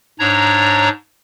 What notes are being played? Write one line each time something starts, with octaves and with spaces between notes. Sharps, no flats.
G#2 D4 C#5 A#5